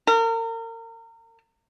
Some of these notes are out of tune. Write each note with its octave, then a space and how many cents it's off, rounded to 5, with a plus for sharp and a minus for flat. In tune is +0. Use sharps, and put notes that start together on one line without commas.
A#4 -35